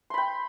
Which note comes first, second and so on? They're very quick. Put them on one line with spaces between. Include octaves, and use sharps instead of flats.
C6 B5 G5